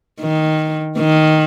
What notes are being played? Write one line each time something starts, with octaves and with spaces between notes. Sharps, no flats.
D#3
D#3